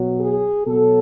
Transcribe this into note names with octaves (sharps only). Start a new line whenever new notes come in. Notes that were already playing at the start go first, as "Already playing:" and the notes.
Already playing: B2 F#3
G#4
B2 F#3 A4